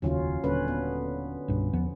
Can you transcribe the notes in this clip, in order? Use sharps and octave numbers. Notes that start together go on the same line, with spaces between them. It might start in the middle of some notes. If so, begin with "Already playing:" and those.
F1 D#2 C#3 F#3 C#4 F4
D#1 D3 C#4 B4
B3
C2 G2 B2
E2 F3 B3